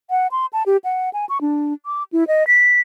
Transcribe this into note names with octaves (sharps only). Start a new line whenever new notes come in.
F#5
C6
A5
G4
F#5
G#5
C#6
D4
D6
E4
D#5
B6